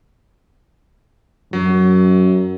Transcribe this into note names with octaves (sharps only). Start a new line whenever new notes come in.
F#2 F#3